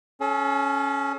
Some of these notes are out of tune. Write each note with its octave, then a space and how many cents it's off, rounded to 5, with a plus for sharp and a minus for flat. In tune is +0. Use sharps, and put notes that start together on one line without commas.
C#4 +0 A4 -40